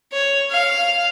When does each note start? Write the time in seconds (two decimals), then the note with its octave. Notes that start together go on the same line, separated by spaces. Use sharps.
0.13 C#5
0.51 F5